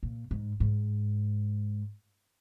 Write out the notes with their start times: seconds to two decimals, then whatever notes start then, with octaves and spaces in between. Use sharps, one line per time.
0.03 A#2
0.31 G#2
0.60 G#2